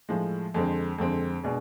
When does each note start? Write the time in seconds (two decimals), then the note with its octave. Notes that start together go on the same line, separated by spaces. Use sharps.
0.09 A2 F3 G#3
0.54 F2 D3 G#3 C4
0.98 F2 D3 G#3 C4
1.43 B2 G#3 D4 G#4